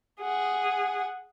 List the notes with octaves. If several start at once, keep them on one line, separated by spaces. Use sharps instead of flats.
G#4 F#5